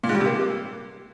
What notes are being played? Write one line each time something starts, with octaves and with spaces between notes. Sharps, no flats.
A#2
G#2
G3
C3
A#3